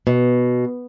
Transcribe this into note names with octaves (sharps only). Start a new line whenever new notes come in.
B2